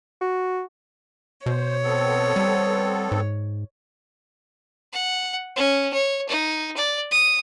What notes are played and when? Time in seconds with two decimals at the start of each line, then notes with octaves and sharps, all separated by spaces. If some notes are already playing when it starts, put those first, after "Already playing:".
0.21 F#4
1.46 B2 C5 C#5
1.84 B3 C4 A4
2.36 G3
3.12 G#2
4.93 F#5
5.56 C#4
5.93 C#5
6.29 D#4
6.77 D5
7.11 D#6